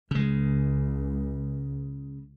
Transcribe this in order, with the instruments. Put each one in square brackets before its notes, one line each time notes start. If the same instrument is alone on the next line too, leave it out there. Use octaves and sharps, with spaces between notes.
[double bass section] C#2 [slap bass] C#3 G#3